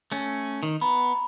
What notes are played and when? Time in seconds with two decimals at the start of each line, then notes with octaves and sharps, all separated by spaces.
0.12 A3 C#4
0.63 D#3
0.81 B3 A#5 B5